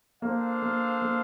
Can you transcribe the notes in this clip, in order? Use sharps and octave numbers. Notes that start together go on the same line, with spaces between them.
A#3 D4 A4 C5 F5
A#3
A#3